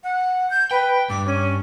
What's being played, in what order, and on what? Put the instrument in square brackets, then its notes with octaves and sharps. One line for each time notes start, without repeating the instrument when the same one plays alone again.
[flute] F#5
G6
[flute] B4 [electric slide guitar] G5
[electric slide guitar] G2 [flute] D6
[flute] C#4